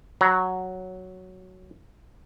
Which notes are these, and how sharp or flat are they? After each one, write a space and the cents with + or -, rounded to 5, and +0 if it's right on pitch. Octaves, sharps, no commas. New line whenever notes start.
F#3 +0 A#5 +35